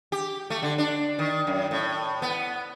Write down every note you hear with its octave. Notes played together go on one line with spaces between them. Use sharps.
G4
A3
D3
D4
D#3
F#2
A2
B3